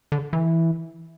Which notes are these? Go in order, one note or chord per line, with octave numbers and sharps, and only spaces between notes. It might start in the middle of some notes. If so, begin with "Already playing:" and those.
D3
E3